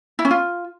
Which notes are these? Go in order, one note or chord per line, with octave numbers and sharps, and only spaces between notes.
E4
C#4
F4